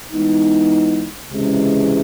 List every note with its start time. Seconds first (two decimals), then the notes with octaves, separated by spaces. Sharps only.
0.12 E3 G#3 B3 D#4
1.30 C#2 C3 E3 G#3 C#4